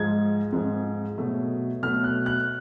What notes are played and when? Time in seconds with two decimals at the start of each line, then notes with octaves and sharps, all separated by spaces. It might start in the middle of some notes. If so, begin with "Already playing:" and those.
Already playing: G#2 F3 G#3 G#6
0.52 G#2 F3 G#3
1.18 B2 F#3 A3
1.82 B2 F#3 A3 F6
2.04 F#6
2.26 F#6